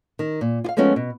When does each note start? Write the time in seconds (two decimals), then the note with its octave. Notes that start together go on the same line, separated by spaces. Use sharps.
0.19 D#3
0.41 A#2
0.64 F4 F5
0.77 F3 G#3 A3 B3 C#4 F4
0.96 B2